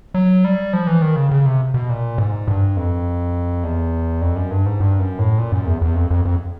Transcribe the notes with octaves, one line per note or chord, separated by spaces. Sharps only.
F#3
G3
F3
E3
D#3
C#3
C#3
C3
B2
A#2
G#2
G2
F2
E2
F2
F#2
G2
G#2
G2
F#2
A2
A#2
F#2
E2
E2
F2
F2
F2